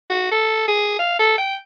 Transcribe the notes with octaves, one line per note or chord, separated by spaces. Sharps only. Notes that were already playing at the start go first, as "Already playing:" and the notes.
F#4
A4
G#4
F5
A4
G5